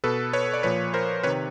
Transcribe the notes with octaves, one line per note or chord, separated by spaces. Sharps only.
B2 A4 B4
B4 C#5
D5
A#2 F3 B4 C#5
A#4 C5
C3 D#3 B4 C#5